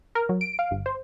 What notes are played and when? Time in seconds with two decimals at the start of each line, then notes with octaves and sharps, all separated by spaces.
0.15 A#4
0.29 F#3
0.41 D7
0.59 F5
0.71 G1
0.86 C5